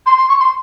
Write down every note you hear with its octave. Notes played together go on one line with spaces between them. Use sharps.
C6
C6
C#6
C6